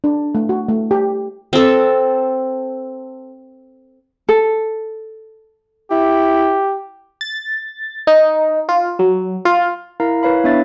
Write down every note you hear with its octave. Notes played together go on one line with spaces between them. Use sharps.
D4
A3
F#4
A3
G4
C4 A4
A4
E4 G4
A6
D#4
F4
F#3
F4
E4 A#4 F5 A#5
E4 B4 C#5 F5 B5
B3 D4 C#5 E5 A6